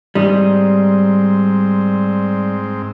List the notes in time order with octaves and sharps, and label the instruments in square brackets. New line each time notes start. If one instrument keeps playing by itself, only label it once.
[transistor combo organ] G#2 C4 [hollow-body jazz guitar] G3 D#4